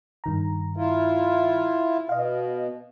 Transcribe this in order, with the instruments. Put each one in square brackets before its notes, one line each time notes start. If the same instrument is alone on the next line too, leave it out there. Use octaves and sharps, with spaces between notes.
[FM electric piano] G2 D#3 A#5
[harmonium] E4 F4
[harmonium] B2 [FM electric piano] D#5 F5